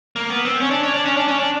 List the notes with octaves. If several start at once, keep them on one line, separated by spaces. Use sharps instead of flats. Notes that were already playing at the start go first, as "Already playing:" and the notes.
A#3
B3
C4
C#4
D4
C#4
D4
C#4
D4
C#4
D4